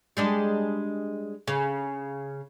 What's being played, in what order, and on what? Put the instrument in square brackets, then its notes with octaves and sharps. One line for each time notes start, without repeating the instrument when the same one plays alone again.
[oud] G3 G#3 D4
C#3